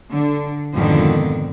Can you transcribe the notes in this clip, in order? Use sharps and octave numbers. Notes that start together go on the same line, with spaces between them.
D3
F2 G#2 B2 D3 D#3